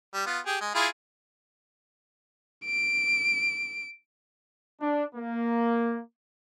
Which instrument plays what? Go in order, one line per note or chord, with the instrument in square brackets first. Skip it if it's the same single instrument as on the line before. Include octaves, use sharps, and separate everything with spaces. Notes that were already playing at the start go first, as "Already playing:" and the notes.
[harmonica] G3
B3 F4
G4 G#4
G#3
E4 F4 G#4
[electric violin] D7
[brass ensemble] D4
A#3